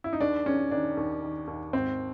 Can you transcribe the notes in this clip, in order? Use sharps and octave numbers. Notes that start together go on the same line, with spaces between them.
E4
D#4
D#2 D4
D#3 C#4
D#3 D4
D#2
D#3
D#2
G#1 C4